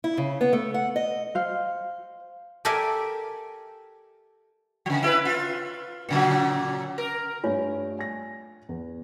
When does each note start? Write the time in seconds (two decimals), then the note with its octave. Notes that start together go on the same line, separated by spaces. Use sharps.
0.04 E4
0.17 C#3
0.41 B3
0.53 A3
0.74 F#5
0.96 D#5
1.35 C5 F5
2.65 G4 A4 A#4 D5 E5 G#5
4.86 C#3 F3
5.03 E4 G#4 B4
5.25 F4
6.09 A#2 C#3 F#3
6.98 A#4
7.44 G2 A3 F4 C#5 G#5
7.99 G#5 A#6
8.69 E2